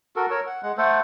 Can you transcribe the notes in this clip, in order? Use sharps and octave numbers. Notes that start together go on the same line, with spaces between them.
F#4 A4 A#4
A#4 C#5 E6
F#5
G#3 F#5
A3 A4 C5 F#5